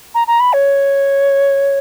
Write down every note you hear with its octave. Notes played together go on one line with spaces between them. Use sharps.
A#5
A#5
B5
C#5